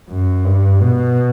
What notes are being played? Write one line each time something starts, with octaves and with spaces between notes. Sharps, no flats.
F#2
G2
B2